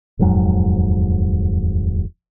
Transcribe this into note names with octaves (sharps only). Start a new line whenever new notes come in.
D#1 F2 G#2 F#3